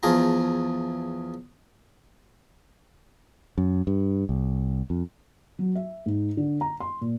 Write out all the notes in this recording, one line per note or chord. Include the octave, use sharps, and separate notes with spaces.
E2 F3 F4 G#4 A5 A#5
F#2
G2
C2
F2
F#3
E5
G#2
D3
A#5
C6
A#2